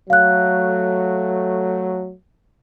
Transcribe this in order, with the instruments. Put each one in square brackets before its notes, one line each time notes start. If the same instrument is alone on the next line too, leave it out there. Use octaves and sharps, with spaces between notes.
[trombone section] F#3 A3 [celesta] F5 F#6